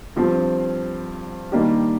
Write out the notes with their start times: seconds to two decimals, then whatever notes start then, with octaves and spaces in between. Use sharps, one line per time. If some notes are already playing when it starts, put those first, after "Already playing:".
0.16 G2 F3 C4
1.52 D#3 G3 A#3 D4 G4